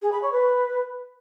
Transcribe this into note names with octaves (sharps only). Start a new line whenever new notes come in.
G#4
B5
C#5
B4